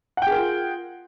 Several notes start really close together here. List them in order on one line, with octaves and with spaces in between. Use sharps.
F#5 G5 G#4 A#4 F4